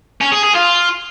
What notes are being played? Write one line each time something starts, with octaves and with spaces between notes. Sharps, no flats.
C#4
G#4
G#4
F4